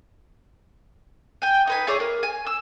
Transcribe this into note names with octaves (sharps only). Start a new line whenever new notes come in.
G5 G#5
D#4 B4 G#5
E4 G#4 C#5 D5
A#3
G#5
E6